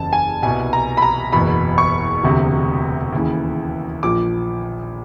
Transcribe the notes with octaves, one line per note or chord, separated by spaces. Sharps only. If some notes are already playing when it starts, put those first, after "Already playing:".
Already playing: F#1 E2 C#3 A5
G#5
C2 B2 G#5
A#5
B5
A#5
F#1 E2 B2 B5
C#6
E1 D2 C3
D#2 C#3 E3
A#1 A#2 F3 D6